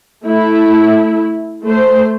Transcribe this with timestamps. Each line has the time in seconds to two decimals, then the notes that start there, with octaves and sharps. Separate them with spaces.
0.24 A3 E4
1.64 A3 C5